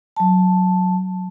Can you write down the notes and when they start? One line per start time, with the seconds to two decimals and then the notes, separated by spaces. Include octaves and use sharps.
0.16 F#3 A5